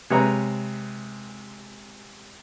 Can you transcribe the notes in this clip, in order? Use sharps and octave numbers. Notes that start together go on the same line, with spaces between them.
C3 G#3 B4 C#5 A#5